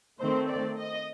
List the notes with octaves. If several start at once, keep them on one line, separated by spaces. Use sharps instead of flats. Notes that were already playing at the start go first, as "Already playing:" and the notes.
D#3 A3 C4 C5
D5
D#5